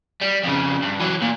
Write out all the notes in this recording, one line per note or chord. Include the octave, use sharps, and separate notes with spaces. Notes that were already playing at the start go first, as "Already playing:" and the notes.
G3
F2 C#3
G2
E3 F#3
A#2